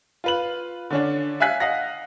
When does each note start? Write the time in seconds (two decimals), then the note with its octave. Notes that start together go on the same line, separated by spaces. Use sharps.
0.24 F4 B4 F#7
0.90 D3 C#4 D4
1.40 E5 F5 G#5 F#6 B6
1.60 D#5 F5 F#5 A#6